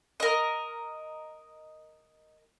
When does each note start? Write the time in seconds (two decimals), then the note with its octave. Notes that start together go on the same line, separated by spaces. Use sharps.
0.20 A#4 D#5